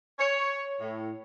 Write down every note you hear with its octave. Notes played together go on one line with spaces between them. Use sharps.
C#5
A2